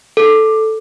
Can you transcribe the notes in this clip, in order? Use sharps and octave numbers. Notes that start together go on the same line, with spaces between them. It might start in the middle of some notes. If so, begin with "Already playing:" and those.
A4